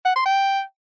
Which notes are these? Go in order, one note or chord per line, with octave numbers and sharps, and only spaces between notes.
F#5
C6
G5